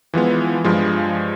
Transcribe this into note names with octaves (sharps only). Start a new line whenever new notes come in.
E3 F3 G#3 B3
G2 F3 G#3